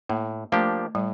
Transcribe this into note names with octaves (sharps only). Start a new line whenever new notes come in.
A2 A#3
F3 A3 A#3 D4 G4
A2 G3